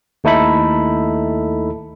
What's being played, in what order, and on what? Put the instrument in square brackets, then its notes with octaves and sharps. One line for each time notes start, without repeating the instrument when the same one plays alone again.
[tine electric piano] D#2 A3 D#4 E4 A4 B5